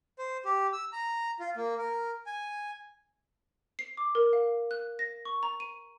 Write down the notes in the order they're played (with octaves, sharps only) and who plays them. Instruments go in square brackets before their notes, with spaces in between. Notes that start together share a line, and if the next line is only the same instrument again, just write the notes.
[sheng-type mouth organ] C5
G4
E6
A#5
F4
A#3
A#4
G#5
[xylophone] C7
D6
A#4
F5
F#6
A#6
C#6
A#5
D#7